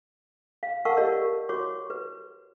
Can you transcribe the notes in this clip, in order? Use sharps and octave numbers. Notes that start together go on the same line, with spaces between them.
F5
A#4 F5 F#5 A5 C#6 E6
G4 A#4 D5 D#5
A#4
F#4 C#5 C#6 D6
B4